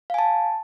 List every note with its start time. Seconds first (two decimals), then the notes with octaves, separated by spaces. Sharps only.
0.10 F5
0.14 G#5
0.19 A5